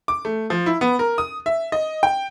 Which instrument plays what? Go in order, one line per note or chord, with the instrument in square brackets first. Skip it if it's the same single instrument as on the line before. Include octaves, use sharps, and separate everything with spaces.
[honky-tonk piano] D6
A3
F3
E4
B3
A#4
D#6
E5
D#5
G5